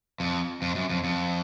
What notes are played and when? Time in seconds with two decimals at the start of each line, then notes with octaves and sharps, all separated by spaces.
0.20 F2
0.62 F2
0.75 F#2
0.89 F2
1.04 F2